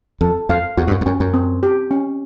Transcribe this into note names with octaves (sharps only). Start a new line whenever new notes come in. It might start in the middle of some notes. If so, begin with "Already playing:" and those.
F2 A4
F2 F5
E2 F#4
G2
F#2
F2
F#2 C#4
F#2
C4
G4
C#4